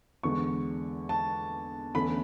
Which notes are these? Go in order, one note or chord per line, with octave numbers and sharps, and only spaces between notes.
E2 D3 G#3 C#6
A5
E2 D3 A3 C#4 B5